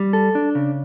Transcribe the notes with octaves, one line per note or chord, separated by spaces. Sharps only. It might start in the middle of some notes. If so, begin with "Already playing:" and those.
Already playing: G3
A4
D4
C#3